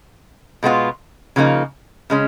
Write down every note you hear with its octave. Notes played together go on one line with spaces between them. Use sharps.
B2 G#3 B3 F4
C#3 F3 A#3 D#4
C#3 G#3 C#4